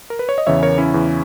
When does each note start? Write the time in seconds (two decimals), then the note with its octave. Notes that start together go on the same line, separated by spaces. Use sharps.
0.10 A#4
0.19 B4
0.29 C#5
0.38 D#5
0.47 E2 C#3 E3 C#5 E5
0.62 A#4 C#5
0.78 C#4 E4
0.94 E2 C#3 E3